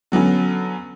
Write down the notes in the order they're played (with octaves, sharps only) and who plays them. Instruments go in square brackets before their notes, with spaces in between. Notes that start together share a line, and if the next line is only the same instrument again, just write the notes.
[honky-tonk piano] D3 F#3 B3 C#4